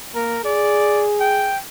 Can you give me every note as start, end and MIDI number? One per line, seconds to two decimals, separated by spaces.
0.15 0.37 58
0.15 0.43 70
0.45 1.53 68
0.45 1.05 74
1.20 1.58 79